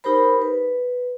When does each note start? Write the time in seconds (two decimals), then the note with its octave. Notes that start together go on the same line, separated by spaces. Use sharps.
0.04 D#4 G4 A#4 C5 B5
0.42 B4